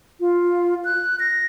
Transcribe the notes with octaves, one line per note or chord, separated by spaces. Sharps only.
F4
F#6
A#6